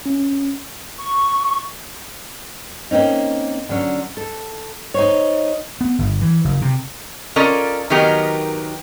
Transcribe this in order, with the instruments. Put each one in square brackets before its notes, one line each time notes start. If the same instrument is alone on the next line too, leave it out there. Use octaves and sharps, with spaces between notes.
[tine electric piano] C#4
[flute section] C#6
[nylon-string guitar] A#3 C4 C#4 D#4
D3 F#3 C#4
A4
D#4 C5 C#5
[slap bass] B3
G1
E3
F#1
C3
[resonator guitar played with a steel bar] C#4 F4 A4 A#4 D5 D#5
D#3 F#3 B3 D#4 G4 A#4